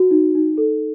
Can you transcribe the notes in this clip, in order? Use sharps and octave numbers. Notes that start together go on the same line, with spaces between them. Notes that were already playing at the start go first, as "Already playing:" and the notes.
Already playing: F#4
D#4
D#4
A4